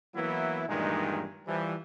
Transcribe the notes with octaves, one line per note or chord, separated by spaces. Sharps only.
E3 F#3 A#3 B3 E4
G2 A#2 D#3 E3 G#3 D#4
E3 F3 G3